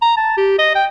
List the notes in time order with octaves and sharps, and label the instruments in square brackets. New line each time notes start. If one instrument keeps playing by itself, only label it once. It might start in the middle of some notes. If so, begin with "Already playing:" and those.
[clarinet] A#5
A5
G4
D#5
G5